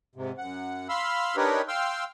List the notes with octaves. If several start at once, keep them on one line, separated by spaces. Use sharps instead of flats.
G#2 C3
F#2 F#5
F5 B5 C6 E6 F6
D4 D#4 G4 A#4 B4 C#5
F5 G5 C6 E6 F6